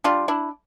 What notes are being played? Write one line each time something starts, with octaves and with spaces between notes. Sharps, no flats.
G3 D4 F4
D4 E4